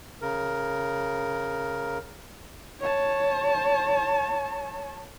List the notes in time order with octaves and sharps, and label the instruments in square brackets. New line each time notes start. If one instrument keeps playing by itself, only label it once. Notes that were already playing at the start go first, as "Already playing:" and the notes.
[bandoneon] C#3 A#4
[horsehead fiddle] C#5 A5